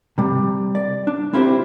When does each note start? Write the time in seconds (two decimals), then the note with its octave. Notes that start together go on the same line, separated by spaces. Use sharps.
0.18 C3 G3
0.75 D5
1.07 D4
1.33 C4 E4 F4 G4 A4 C5